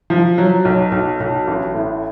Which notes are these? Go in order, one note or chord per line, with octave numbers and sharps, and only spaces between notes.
F3
F#3
B1
B1
B1
A1
A2